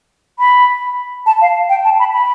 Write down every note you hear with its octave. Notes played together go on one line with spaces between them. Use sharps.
B5
A5
F5
G5
A5
B5
B5